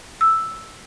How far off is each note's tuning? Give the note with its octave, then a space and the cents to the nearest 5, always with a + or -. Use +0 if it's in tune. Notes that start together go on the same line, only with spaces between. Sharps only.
E6 +0